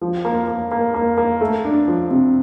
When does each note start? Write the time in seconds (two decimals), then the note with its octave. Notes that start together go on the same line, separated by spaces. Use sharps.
0.01 F3
0.25 A#3
0.48 A#3
0.71 A#3
0.94 A#3
1.17 A#3
1.41 A3
1.65 D4
1.88 F3
2.10 C3